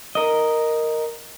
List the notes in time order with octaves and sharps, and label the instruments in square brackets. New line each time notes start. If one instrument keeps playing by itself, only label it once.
[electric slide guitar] A#4 D#5